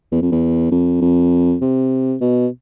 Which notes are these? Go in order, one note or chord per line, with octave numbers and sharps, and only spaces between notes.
E2
F2
E2
F2
F2
C3
B2